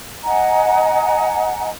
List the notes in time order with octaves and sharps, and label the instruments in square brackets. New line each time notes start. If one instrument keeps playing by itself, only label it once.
[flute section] D#5 F#5 G#5 A#5